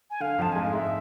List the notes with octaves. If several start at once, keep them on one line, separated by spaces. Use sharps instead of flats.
G#5
D3 F5
F2 F3 A5
G#2 G#3 G#5
F5
G#2 G#3 E5